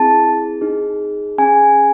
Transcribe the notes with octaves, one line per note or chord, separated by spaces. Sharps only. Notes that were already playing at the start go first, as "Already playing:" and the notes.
Already playing: C4 E4 G#4 A5
D#4 G#4
C#4 G#4 G#5